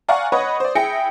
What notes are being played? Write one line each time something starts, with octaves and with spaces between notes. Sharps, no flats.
D5 F5 F#5 G#5 A#5 C#6
B4 C#5 D#5 F#5 C#6 D#6
C5 D5
E4 G#4 G5 A#6 C#7